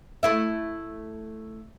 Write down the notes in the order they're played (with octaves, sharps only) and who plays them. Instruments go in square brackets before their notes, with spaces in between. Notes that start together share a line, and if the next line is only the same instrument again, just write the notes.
[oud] A3 E4 E5